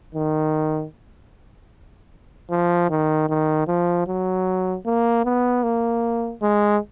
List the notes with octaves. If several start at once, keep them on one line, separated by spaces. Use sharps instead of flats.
D#3
F3
D#3
D#3
F3
F#3
A#3
B3
A#3
G#3